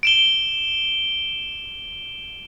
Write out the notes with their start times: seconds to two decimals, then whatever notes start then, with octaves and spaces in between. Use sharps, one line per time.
0.03 D7 E7 G7